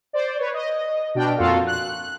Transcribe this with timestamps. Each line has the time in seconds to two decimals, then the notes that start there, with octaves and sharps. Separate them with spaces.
0.13 C5 D5
0.38 B4 C#5
0.54 D#5
1.15 B2 D4 D5 G5 F6
1.38 F2 A#2 F4 F#4 A4 F5
1.67 F#6